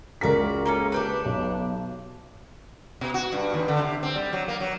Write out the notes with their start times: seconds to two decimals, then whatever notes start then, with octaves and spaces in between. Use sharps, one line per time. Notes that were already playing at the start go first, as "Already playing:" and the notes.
0.21 C#2 F#4 A#4 D5 B6
0.66 A#3 C#4 A4
0.92 D4 G4 B4
1.25 B1
3.01 B2
3.14 F#4
3.32 G2
3.54 D#2
3.68 D3
3.81 C3
4.03 C4
4.15 G3
4.33 F#3
4.48 A#3
4.60 F#3